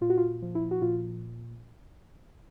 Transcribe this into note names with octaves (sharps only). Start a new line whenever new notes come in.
A#2 F4
F#4
F4
F3
E4
F#4
A#2 F4